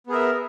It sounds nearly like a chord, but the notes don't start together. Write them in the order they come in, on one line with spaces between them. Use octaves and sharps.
B3 G#4 A#4 E5